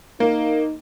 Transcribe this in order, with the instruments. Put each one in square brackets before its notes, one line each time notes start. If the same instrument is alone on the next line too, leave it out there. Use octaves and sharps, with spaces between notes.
[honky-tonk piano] A#3 [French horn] D#4